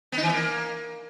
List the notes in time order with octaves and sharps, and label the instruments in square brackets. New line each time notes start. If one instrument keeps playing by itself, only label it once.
[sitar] B3
D#4
E3
B3
A#3